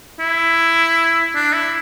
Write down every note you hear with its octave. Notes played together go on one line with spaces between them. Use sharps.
E4
D4
E4